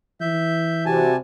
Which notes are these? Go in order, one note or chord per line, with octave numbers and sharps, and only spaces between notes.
E3 E5 G6
C3 G3 F#4 G#5 A5